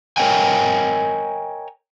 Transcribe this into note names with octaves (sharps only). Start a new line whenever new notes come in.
A#4 C#5 D#5 G5 G#5